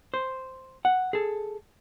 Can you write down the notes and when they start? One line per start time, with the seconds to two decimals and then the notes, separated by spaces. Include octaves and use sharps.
0.14 C5
0.85 F#5
1.13 G#4 A4